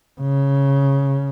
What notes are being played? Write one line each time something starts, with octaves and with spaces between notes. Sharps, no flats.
C#3